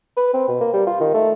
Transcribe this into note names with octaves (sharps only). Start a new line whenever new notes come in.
B4
C4
B2
A#3
G3
F4
D#3
A3